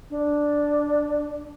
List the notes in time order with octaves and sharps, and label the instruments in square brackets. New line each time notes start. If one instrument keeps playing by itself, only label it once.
[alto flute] D4